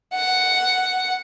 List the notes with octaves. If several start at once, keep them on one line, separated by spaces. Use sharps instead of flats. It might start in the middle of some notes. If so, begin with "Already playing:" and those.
F#5